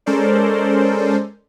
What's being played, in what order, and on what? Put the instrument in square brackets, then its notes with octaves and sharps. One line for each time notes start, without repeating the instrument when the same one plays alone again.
[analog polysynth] G#3 C#4 A4 A#4 C5 D5